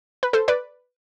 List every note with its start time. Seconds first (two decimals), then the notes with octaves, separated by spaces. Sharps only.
0.23 B4
0.33 A4 C5
0.48 B4 D5